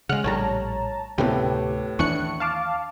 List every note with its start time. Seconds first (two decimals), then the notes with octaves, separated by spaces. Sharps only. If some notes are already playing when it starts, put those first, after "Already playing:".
0.09 C#3 G#3 F#5 F6 F#6
0.24 A#1 A2 G3 C#5 A5 A#5
1.18 D2 A2 C3 B3 C4 E4 G4
1.99 D#2 E3 D4 C#6 F#6 C#7
2.40 F5 A5 D6